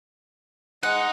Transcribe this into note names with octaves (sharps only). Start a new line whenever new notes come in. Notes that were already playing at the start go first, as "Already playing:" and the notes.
G#3 D#4 F#5